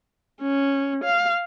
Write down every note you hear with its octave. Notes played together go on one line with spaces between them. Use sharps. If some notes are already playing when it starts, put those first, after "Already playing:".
C#4
F5